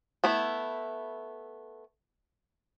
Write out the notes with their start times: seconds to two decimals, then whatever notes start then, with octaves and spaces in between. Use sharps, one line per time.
0.24 A3 B3 E4